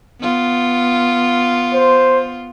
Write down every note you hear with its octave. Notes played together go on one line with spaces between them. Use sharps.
B3 F4
C5